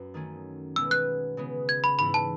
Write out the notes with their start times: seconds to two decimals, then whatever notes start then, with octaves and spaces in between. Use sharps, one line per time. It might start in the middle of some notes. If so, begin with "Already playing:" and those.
Already playing: F#2 B3
0.14 D#3 A3 C#4
0.76 B2 G#3 B3 E6
0.91 F#6
1.37 C#3 G#3 B3
1.69 G#6
1.84 B5
1.99 G#2 E3 B3 E4 B5
2.14 A5